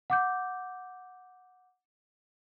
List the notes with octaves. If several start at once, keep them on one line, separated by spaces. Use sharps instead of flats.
F#5 D6 G6